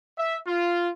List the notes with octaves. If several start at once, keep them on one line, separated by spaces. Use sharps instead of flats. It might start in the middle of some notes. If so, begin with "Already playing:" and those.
E5
F4